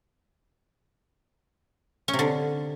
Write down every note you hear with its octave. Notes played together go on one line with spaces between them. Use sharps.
C#4
C3
D3